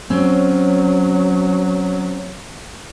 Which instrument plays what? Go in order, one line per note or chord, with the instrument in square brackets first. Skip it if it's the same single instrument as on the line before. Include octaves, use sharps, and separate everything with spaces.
[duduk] F#3 [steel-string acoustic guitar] C4 C#4